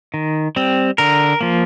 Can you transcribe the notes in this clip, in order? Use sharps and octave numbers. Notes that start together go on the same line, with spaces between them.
D#3
G3 C4
D3 A#4
F3 A#3